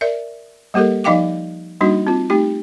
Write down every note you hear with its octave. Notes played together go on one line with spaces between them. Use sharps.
A#4 D5 E5
G3 A#3 G4 A4 A#4
F3 D#4 D#5 F5 G5 D6
G3 A#3 D4 D#4 F#4
C4 F4
A3 D#4 G4